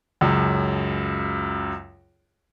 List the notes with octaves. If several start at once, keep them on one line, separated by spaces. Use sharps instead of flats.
C#2 F#2